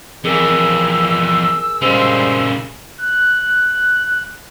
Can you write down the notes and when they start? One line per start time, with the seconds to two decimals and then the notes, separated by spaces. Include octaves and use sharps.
0.25 F2 E3 G#4 A#4 G#5 E6
1.82 A#2 C#3 G3 G#3 C5
2.98 F#6